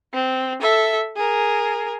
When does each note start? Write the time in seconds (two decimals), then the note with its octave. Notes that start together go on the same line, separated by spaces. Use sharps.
0.13 C4
0.61 A4 E5
1.16 G#4 A#4